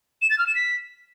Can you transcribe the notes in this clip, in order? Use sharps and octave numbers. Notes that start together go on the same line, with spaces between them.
E7
A6
F6
E7
B6